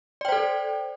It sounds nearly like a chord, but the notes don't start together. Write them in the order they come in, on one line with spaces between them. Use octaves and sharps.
D5 G5 C5 A4